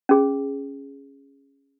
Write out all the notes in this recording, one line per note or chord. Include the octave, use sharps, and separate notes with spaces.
C#4 G#4